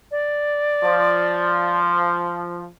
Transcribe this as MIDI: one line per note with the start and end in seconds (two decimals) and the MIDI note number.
0.11 1.79 74
0.83 2.65 53